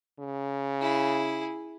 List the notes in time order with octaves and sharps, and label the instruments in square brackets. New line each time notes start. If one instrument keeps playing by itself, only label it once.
[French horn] C#3
[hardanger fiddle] E4 G#4